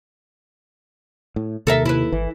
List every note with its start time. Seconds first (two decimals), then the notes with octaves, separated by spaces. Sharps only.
1.36 A2
1.67 D#2 C3 A4 A#4 E5
1.85 C3 E4 B4
2.12 G#1 E3